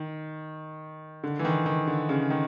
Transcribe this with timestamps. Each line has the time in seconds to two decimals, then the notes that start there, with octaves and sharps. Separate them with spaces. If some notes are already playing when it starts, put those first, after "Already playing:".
Already playing: D#3
1.24 D3
1.39 E3
1.45 D#3
1.66 D#3
1.87 D3
2.09 C#3
2.30 D#3